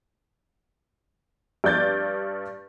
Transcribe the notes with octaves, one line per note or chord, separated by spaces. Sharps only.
G2 D5 G6 A6